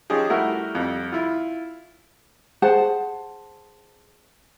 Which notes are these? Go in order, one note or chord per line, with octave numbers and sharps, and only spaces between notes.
F3 C#4 D#4 G4 G#4
G3 A3 E4 F#4 A#4 E5
F2 G3
E4 F4
G#4 C5 F#5 A5